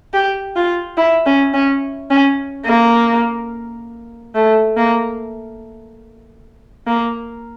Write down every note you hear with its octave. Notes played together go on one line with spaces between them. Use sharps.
G4
F4
E4
C#4
C#4
C#4
A#3
A3
A#3
A#3